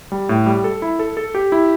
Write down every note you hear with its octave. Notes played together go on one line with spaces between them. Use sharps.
G3
A2
G3
A4
E4
A4
A4
G4
E4